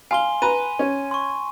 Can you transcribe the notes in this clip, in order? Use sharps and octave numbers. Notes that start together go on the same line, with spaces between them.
F5 G#5 C6 G7
B4 A#5 D#7
C#4
C6 C#6